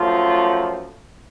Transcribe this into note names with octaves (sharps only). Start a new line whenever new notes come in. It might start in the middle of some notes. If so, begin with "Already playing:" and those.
Already playing: F#2 F3 A3 F4